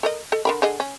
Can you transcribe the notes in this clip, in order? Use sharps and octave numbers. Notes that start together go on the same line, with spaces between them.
A4 A#4 D#5
A4 D#5
D3 A#4 B5
D3 G#4 D#5
C#4